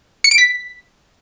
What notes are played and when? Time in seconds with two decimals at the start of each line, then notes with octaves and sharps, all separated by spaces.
0.24 C#7
0.31 D7
0.38 B6